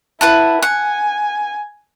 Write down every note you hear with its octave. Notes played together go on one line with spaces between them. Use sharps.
E4 B4 F#5 A5
F#5 G#5